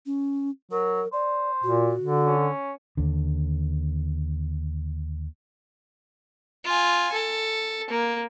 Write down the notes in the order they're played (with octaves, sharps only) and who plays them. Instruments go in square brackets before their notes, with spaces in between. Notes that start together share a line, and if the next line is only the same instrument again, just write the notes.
[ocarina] C#4
[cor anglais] F#3 [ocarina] A#4
[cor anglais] C5 [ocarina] D5
[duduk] A#2 [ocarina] F#4
[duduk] D3
[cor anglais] C#4
[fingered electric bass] D#2 D3
[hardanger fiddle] F4 G#5
A4
A#3